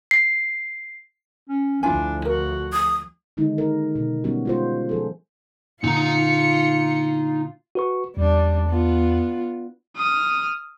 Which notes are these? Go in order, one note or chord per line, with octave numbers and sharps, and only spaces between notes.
C7
C#4
D2 F3 D4 E4 F4 G#5
F#4 A#4
D#6
D3 D#3 G#3 D#4
A#4
B2
G3 G#3 B3 C#4 F#4
G#3 F4 C5
F3 G#4 A4
A#2 D3 D#4 F4 A#5 C#7
F#4 B4 C#6
E2 G3 D4
B3 F4
D#6 F6